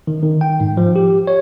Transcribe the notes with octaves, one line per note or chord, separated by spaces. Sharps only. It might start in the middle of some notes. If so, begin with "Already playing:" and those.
D#3
D#3
G5
G#2
F3
G4
C#5